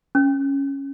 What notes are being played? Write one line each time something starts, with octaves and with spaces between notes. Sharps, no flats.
C#4